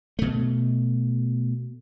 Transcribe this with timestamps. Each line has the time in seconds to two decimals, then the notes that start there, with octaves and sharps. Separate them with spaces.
0.19 B2 A3